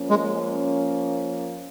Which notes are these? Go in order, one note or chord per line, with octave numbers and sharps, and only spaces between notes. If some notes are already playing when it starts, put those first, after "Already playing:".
Already playing: F3 A#3 C#4
G#3